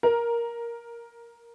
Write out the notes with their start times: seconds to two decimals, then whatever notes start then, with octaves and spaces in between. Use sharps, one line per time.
0.03 A#4